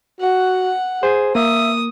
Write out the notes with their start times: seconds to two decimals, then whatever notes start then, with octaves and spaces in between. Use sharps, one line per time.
0.21 F#4 F#5
1.03 G#4 C5
1.35 A#3 E5 D#6